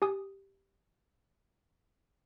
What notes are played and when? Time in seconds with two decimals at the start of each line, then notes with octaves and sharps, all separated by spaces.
0.02 G4 G#5 D#6